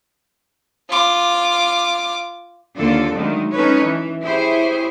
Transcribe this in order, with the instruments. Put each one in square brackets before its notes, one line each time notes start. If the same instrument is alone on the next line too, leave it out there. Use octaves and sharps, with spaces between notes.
[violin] F4 D6
[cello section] D#2 D3 A#3 F4 A4 D5
D3 D#3 F#3 G#3 A3
C#4 D#4 A4 B4 C#5
E3
E4 G4 G#4 C5 C#5